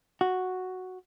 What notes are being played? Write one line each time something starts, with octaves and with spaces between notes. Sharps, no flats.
F#4